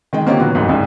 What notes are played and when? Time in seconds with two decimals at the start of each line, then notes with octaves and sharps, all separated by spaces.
0.13 D#3 G#3 G5
0.26 D3 A#3 C4 C#4 F4 G4
0.39 A#2 D#3 F#3 B3 F#4
0.55 C2 F2 G#2
0.69 C2 G#2 C#3